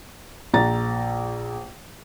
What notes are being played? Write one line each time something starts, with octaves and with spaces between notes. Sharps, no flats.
A#1 A#5 A6